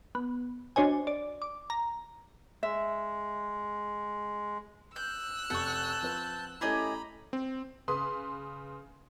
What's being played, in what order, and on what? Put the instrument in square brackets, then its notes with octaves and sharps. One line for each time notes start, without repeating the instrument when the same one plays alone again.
[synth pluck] B3
D4 F#4 C5 C#5 D#5 G#5
D5
D6
A#5
[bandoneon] G#3 [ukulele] E5
[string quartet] E6 F#6 [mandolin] G6
[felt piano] F1 [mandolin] F#5 C#6 [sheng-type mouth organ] A5 G6
[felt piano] F3 C4 B4
[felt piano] A3 C#4 E4 [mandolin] G4 G#4 D#5 [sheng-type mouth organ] A#5 B5
[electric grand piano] C4
[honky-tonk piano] C#3 B4 C6 D#6